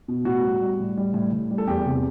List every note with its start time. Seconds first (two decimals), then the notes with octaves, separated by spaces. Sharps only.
0.08 B2
0.25 A2 F#4
0.44 G3
0.62 G3
0.80 A2
0.97 G3
1.14 A2
1.33 A2
1.51 G3
1.58 A4
1.68 E2 G4
1.86 C3